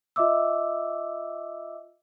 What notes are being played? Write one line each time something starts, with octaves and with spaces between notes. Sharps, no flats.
F4 D#5 E5 D6 E6